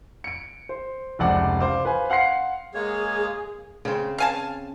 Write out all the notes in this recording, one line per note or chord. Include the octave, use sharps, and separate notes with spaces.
C#7 D7
C5
F1 C#2 D5 F#5 D6
C5 F5 D6
B4 C5 F5 G#5
F5 F#5 C6 C7 C#7
G#3 A#3 G#4 C#5
C#3 C4
F5 G#5 A5